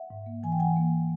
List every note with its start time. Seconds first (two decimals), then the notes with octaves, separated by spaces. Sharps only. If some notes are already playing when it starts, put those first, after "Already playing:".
Already playing: E5 F#5
0.10 G#2
0.26 A#3
0.43 E3 G#5
0.52 G5
0.59 E3 F#5 G#5
0.77 A#3